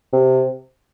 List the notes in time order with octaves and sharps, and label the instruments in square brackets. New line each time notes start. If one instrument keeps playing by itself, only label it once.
[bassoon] C3